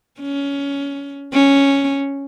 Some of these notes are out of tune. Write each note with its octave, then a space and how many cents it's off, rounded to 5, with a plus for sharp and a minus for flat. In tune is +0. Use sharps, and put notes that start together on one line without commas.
C#4 +20
C#4 +0